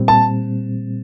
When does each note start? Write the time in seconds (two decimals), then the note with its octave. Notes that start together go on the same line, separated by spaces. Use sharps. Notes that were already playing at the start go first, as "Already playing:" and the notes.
Already playing: A#2 G3 C4
0.08 A5